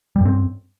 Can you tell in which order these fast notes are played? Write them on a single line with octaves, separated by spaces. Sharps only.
G3 G2 C4